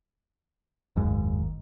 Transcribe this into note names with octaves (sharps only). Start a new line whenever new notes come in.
F#1 D#2 G#2